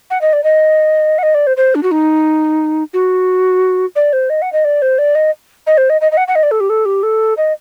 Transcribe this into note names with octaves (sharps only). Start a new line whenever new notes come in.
F#5
D#5
D5
D#5
F#5
D#5
D5
C5
C5
D4
F#4
D#4
F#4
D5
C5
D#5
F#5
D#5
D5
C5
D5
D#5
D#5
C5
D#5
D#5
D#5
F#5
F#5
D#5
D5
A4
G4
A4
G4
A4
D#5